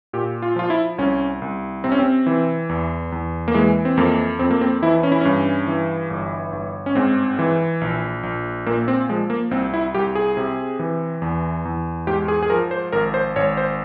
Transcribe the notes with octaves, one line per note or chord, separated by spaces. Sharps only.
A#2 G4
F4
F3 F4
E4
C2 C#4
C2
C3 C4
C#4
C4
E3
E2
E2
A#3
E3 G#3
C4
F2 A#3
F2 C4
A#3
C4
E3 E4
C#4
E4
G2 C#4
E3
G1
G1
C#4
G#2 C4
E3
A#1
A#1
A#2 A#3
C4
F3 G#3
A#3
C2 C4
E4
C2 G4
G#4
C3
E3
E2
E2
G#2 G4
G#4
G#4
F3 A#4
C5
G#1 A#4
C5
G#1 C#5
C5